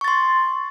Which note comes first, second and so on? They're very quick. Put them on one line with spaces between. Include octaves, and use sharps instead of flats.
C#6 A6 C6